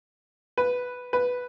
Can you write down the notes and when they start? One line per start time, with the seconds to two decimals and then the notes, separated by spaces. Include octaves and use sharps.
0.58 B4
1.13 B4